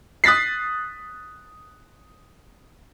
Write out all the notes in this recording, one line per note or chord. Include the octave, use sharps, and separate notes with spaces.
D#6 F#6 A6 B6 C7